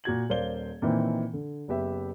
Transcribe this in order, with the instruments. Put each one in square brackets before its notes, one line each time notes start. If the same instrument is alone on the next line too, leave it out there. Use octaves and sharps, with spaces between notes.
[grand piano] A#2 F#4 G#6 F#7
D#1 A#4 C5 D5 F5 G7
A#2 D#3 E3 A#3 C4
D3
F#1 B3 G4 E5